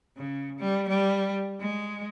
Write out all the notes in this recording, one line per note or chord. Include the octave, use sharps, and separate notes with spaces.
C#3
G3
G3
G#3